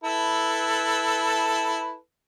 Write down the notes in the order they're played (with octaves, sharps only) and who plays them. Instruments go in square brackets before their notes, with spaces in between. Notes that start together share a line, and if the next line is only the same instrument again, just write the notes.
[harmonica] E4 A4 B4